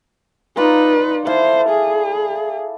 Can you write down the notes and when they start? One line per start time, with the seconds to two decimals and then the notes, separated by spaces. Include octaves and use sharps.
0.57 D#4 F4 B4 D5 A#5
1.27 E4 A4 C5 F5
1.69 G#4